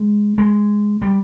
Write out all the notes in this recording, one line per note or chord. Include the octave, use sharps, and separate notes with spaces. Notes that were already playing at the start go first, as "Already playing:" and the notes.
Already playing: G#3
G#3
G3